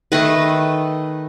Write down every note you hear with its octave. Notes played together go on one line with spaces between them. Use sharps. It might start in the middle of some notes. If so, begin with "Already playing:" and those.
D#3 A3 B4 D#5